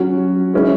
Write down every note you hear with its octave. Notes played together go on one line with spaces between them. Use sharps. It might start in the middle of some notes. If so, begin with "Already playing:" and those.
Already playing: F#3 C#4 F#4
G#3 C#4 E4